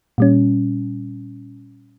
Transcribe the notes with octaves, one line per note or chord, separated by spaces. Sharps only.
A#2 G3 C#4